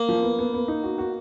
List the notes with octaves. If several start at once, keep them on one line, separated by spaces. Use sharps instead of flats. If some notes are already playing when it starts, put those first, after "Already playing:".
Already playing: A#3
F3
B3
B3
B3
D#4
F#4
F#4